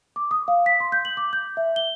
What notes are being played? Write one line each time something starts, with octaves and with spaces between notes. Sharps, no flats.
D6
D#6
F5
B6
C6
G6
F#7
D6
G6
E5
G7